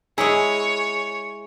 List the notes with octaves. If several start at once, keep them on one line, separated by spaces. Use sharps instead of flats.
G#3 E4 G#4 C#5